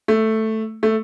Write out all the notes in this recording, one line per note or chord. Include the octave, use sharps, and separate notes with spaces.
A3
A3